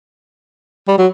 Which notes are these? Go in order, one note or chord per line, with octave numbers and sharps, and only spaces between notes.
G3
F#3